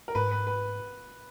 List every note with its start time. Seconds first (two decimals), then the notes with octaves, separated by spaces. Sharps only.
0.08 A#4
0.15 G#2 B4
0.31 B4
0.47 B4